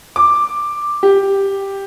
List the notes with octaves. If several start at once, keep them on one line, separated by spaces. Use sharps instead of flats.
D6
G4